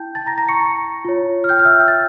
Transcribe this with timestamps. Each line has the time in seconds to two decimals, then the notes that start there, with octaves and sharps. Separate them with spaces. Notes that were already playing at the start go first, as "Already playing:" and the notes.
Already playing: E4 G5 A5 G6
0.15 A5 A6
0.26 A#5 A#6
0.38 A#5 A#6
0.48 C#6 C#7
0.60 A#5 A#6
1.05 F4 C#5
1.44 F6
1.49 G5 G6
1.59 F6
1.65 E5 E6
1.80 G5 G6
1.88 A6